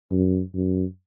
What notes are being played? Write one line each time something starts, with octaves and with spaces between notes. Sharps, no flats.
F#2
F#2